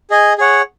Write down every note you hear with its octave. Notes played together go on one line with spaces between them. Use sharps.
G#4 D#5 G#5
G#4 C#5 F#5